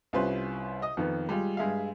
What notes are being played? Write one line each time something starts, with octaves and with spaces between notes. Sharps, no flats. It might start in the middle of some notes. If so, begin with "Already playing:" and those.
C2 C#4 F4 B4 C5 C6
D#5 D#6
F2 D#3 B3
G3 G#3 F4
G2 G#3 E5 F5